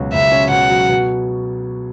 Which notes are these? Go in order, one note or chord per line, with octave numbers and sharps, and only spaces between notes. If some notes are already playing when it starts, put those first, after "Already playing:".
Already playing: C#2 B2 F#3 C#4
C#2 E5
C#4
B2 F#5
F#3
B2